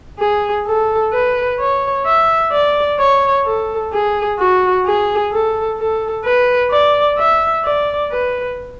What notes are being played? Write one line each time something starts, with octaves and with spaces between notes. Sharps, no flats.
G#4
A4
B4
C#5
E5
D5
C#5
A4
G#4
F#4
G#4
A4
A4
B4
D5
E5
D5
B4